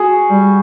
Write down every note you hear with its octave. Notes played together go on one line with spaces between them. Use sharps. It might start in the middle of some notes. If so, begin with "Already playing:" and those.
Already playing: F#4 G#4
G3